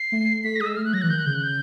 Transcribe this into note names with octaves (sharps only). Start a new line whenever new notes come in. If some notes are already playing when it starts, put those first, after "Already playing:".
Already playing: C7
A3
A3 B6
A#6
G#3 D#6
E6
A3 F6
F#6
F#3 A#6
E3 F#6
D#3 G6
F#6
C#3 G6
F#6
G6